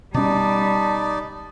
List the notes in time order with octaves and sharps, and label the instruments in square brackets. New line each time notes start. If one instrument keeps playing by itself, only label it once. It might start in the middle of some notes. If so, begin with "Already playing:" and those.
[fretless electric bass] B2 C#4 [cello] G3 [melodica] D#4 D5 [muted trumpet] A5